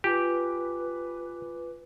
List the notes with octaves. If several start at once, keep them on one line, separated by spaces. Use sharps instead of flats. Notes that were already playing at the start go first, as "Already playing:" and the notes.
F4 G4 B4 G#5 D6